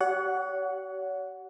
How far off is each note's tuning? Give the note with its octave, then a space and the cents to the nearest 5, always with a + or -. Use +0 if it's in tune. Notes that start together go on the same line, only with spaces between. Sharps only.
G4 -45 C#5 +35 F#5 -5